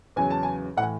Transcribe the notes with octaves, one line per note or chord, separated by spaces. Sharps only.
E2 C#3 F#3 G#5
A5
G#5
A2 F#5
E3